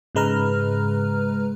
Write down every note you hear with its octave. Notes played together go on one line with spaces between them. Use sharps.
G#2 C#3 G#3 B4 A#5 F6